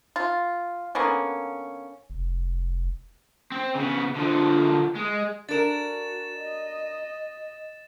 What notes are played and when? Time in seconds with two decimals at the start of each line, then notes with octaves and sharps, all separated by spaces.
0.16 F4
0.95 D3 A#3 B3 C#4
2.10 F1
3.52 C4
3.75 C#3 B3
4.16 D3 F3
4.96 G#3
5.49 D4 F#4 A#4 A6 E7
6.37 D#5